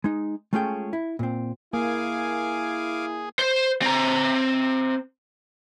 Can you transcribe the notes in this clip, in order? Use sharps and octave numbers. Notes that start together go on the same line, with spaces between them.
G#3 D#4
G#3 A3 C#4 F4 G#4 G5
E4
A#2 C4
A#3 E4 G#4 F5 G#5 D6
C5
C4 A#5